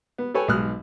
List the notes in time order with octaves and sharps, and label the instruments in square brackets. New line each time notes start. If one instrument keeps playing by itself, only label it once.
[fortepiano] B3
A4 B4 C#5 G5 G#5
B1 G#2 D#6 F6 F#6